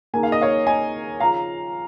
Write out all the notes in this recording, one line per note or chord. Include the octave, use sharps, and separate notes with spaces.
C#3 A#3 D#4 G#5
F5
D#5
C#5 F5
D#5 G#5
C#3 F3 C#4 F5 A#5